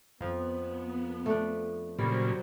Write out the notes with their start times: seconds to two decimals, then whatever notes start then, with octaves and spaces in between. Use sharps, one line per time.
0.21 F2 F3 B3
1.26 A3 D4
1.99 A#2 C#3 F#3 G3 C5